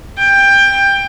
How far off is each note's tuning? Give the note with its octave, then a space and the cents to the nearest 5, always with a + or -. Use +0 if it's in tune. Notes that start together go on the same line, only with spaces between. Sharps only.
G5 +20